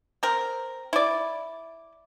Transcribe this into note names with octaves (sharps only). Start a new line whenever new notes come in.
C4 A#4
E4 D5